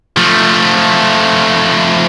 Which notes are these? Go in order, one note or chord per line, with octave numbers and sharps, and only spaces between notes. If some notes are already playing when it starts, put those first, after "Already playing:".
F3 A3